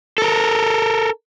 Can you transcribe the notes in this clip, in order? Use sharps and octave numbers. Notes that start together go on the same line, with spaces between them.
A4 A#4